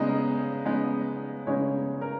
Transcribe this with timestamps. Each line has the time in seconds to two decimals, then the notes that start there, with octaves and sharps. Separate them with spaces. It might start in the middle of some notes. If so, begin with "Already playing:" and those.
Already playing: C#3 G#3 B3 D#4 D#5
0.65 C#3 G#3 B3 D#4
1.47 C#3 G#3 B3 D#4 C#5
2.01 A#4